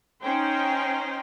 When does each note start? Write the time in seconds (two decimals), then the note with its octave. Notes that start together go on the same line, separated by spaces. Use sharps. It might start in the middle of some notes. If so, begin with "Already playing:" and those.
0.21 C#4 D#4 C5 G5